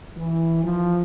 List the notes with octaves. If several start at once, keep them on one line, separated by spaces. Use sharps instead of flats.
E3
F3